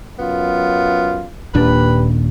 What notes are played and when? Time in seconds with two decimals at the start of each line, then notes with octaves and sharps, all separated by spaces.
0.19 F#2 B3 F4
1.55 D#1 A#2 D4 G4 B4